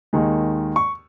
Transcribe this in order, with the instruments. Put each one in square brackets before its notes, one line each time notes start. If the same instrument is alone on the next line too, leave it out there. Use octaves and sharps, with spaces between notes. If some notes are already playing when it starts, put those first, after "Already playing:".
[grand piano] D#2 D#3 G#3
C#6